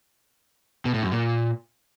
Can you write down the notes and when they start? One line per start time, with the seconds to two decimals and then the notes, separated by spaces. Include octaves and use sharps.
0.85 B2
0.94 A2
1.03 F#2
1.12 A#2